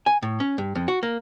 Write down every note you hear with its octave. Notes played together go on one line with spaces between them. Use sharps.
G#5
A2
C#4
G2
F2
F#4
A#3